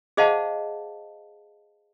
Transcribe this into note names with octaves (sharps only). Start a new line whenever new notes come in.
G#4 C5 D#5 F5 F#5 A5